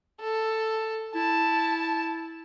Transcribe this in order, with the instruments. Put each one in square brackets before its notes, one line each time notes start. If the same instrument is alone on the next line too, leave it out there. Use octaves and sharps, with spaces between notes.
[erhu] A4
[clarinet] E4 [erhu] A5